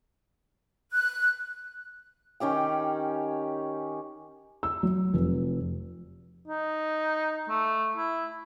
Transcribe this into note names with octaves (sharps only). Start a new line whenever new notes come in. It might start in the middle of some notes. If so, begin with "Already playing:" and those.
F#6
D#3 C#4 G4 G5
E6
F#3
F1
D#4
A3
E4